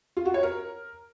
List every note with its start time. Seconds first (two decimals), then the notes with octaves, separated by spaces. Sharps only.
0.17 F4
0.25 F#4
0.34 C#5
0.43 A#4